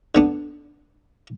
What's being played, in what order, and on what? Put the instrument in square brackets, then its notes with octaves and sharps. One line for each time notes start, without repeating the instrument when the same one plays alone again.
[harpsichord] D3 B3 D4